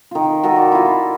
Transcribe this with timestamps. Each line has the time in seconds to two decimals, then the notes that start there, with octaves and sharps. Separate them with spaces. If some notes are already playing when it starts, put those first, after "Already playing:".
0.11 D#3 F4
0.44 F#4 A4 A#4 D#5
0.56 D5
0.72 E4 F4